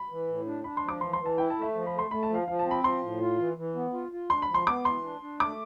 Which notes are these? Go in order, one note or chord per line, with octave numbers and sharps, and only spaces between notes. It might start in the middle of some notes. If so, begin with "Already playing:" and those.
Already playing: B5
E3
A2
D4
D4 B5
C6
F3
D6
E3 C6
C6
E3
A5
E4 G5
A5
A3
E5
F3
B5
A3
C6
A3 B5
A5
F3 F5
F3 F5
A5
C4
B5
F3 C6
A2
F4
E3
E3
B3
F4
F4
D4 C6
B5
F3
C6
B3 D6
E3 C6
D4
D4
A3 D6